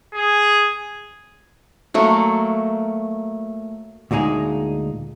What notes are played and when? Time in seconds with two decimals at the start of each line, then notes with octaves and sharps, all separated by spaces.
0.14 G#4
1.94 F#3 A3 A#3
4.11 D2 A#2 G#3 D#4 G#4